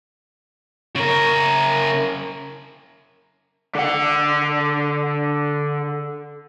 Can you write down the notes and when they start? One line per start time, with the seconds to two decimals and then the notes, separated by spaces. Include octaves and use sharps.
0.96 C#3 A#4
3.75 D3 F#5